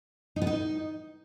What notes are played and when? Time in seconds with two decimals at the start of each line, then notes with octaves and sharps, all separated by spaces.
0.36 D#4
0.42 B3
0.47 D#4